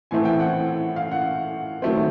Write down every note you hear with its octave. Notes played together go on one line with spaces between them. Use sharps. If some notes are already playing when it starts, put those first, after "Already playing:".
A2 E3 A3 C4 G#5
G5
F#5
F5
F#5
D#3 F#3 A3 C4